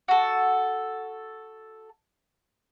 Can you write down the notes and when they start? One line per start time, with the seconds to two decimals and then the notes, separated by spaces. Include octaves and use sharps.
0.08 F#4 A4